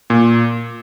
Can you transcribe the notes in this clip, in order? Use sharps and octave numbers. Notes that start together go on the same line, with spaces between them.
A#2